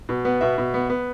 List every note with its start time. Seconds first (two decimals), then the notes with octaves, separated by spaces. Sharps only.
0.09 B2
0.25 B3
0.41 B2 E5
0.58 B2
0.74 B3
0.90 B3